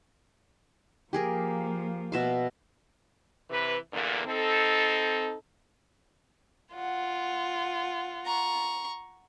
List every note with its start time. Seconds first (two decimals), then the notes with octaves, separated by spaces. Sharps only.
1.13 F3 A#3 G4 G#4 A#4
2.12 B2 E5 F5
3.50 C3 E3 B4
3.92 E2 G2 A#2 D3 A#3
4.26 C4 D#4 A4
6.75 F4 F#5
8.25 A#5 C#6